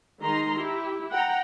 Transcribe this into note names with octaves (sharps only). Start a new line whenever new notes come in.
D#3 G#3 D#4 A#5 C6
E4 G4
F#5 G5 A#5